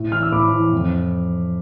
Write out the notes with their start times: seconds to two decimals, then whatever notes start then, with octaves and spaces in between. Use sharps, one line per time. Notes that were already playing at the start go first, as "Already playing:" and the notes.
Already playing: A2
0.12 E3 F6
0.23 E6
0.32 A2 B5 D6
0.52 E3
0.73 F2